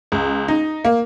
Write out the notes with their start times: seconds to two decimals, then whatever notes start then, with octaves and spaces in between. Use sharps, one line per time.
0.12 C#2
0.48 D#4
0.85 A#3